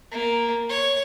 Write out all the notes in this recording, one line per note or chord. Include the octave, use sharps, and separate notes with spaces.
A#3
C#5